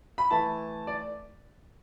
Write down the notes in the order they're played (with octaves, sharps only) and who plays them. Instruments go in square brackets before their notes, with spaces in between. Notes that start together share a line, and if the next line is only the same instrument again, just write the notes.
[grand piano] B5
E3 A3 E4 A5
D5